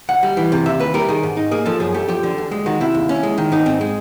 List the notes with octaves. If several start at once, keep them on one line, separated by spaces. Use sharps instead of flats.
D2 F#5
G3
E3
C3
D#2 E5
D#2 B4
G3 A#4
D#3 G#4
G#2
D#4
A#3 G#4
F3 A4
F#2 G#4
A3 G4
F3 G4
D3
D2
G#3
D#3 F#4
C3 E4
D#2
C#4
G#3
D#3
G#2 D#4
C4
G#3